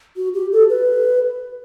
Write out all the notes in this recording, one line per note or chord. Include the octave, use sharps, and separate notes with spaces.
F#4
G4
A4
B4